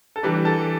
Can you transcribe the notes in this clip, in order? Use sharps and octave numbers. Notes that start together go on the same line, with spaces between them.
A4
E3 G3 D4 B4
A4